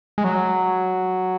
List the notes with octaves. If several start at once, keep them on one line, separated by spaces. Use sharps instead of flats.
G#3
F#3